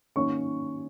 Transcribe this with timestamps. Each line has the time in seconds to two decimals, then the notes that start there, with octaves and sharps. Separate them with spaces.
0.16 D#3 A#3 C#4 C#5 C#6